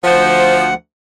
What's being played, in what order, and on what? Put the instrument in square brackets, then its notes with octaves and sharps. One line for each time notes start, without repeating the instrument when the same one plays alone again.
[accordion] D2 F#5 [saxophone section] F3 C5